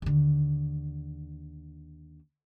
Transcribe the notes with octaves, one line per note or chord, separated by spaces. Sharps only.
D#2 D3